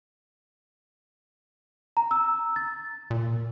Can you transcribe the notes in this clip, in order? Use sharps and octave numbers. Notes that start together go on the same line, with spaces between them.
A#5
E6
A6
A#2